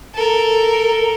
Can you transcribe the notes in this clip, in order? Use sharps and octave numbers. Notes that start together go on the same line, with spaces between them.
A4 A#4